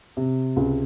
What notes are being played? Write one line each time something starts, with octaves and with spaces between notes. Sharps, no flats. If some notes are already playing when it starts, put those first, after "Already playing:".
C3
C#2